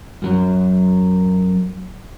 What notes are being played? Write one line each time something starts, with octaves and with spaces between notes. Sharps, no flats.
F#2 F#3